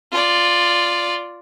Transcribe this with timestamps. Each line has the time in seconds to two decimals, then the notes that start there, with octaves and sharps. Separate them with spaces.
0.12 F4 D5